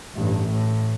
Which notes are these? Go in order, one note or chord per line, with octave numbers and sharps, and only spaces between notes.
A1 G2
A2